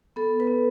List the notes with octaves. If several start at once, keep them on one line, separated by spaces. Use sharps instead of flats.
B3 A4
B4
B3